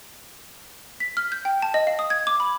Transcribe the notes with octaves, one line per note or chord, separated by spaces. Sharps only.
B6
F6
G6
G5
A5
D#5
F5
D#6
G#6
D6
B5